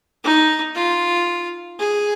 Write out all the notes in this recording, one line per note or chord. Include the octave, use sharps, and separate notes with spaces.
D#4
F4
G#4